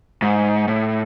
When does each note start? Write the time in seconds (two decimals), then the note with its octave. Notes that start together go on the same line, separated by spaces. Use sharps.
0.22 G#2
0.68 A2